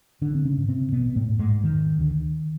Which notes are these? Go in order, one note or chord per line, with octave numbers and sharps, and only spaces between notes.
A1 D3 D4
C4
C#3 C#4
G#2
C3 C4
A1 B2 B3
A2 A3
G#2
G#2 G#3
E1 D#3
D2 D3